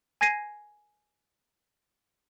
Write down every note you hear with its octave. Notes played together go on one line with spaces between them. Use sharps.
G#5 G#6 A#6 C7 D#7